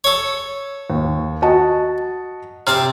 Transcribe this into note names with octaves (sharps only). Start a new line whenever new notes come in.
A4 C#5
D#2
F#4 D#5 A5
C3 C4 A5 F6